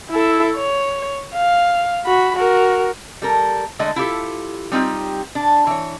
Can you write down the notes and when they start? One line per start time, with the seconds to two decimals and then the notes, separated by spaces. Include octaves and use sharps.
0.10 E4 A4
0.56 C#5
1.35 F5
2.06 F#4 B5
2.37 F#4 A#4
3.22 G3 A4 A#4
3.79 D3 G#3 A3 D5 D#5
3.96 E4 F4 G4 A4
4.72 G3 C4 D#4 F4 G4
5.35 D4
5.67 E3 C#5